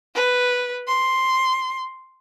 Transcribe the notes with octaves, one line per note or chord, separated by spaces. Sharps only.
B4
C6